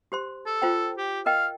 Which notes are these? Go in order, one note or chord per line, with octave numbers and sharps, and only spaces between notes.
G4 C5 C6
A4
F4 C5 G5
G4
A#4 D#5 F5 G5